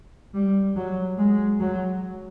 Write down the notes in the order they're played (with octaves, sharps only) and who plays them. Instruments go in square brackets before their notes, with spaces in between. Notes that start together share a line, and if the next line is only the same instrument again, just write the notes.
[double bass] G3
F#3
G#3
F#3